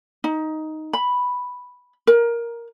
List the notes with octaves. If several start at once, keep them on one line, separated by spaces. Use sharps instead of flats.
D#4
B5
A#4